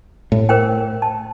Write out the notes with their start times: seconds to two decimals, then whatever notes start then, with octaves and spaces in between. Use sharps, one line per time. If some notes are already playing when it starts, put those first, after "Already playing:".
0.32 A2
0.49 A#4 C5 G5
1.02 A5